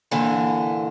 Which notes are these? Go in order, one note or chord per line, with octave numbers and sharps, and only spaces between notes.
A#2 D3 E3